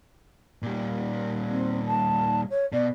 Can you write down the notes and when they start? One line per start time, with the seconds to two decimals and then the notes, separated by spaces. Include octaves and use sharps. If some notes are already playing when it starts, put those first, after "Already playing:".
0.62 A#2 G3
1.49 C4
1.87 A5
2.50 C#5
2.72 B2 D5